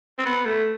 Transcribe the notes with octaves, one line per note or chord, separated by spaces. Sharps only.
C4
B3
A3